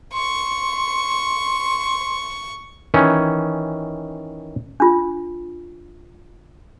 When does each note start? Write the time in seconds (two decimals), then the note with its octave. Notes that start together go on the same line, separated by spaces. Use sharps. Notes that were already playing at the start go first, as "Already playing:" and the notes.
0.14 C6 C#6
2.94 D#3 E3 C#4
4.80 D4 F4